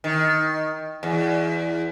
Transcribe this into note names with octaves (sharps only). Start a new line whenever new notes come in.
D#3
E2